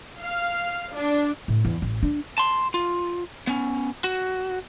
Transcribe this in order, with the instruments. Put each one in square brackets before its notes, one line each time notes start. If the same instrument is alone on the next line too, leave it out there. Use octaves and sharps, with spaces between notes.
[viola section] F5
D4
[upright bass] A2
E2
A1
D4
[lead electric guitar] A5 C6
F4
B3 C#4
F#4